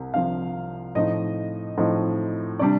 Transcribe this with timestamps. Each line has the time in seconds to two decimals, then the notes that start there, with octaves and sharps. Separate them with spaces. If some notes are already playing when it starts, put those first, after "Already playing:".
Already playing: C2 C3
0.13 C2 C3 F3 F5
0.95 A2 F3 C4 D#4 D#5
1.78 A2 F3 C4 D#4
2.59 C3 G3 D4 D5